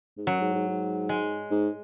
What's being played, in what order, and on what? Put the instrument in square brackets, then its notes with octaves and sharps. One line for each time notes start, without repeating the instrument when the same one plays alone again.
[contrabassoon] G#2
[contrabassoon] F#2 [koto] F#3
[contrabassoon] G#2
G#2
G#2
[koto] G#3
[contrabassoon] G#2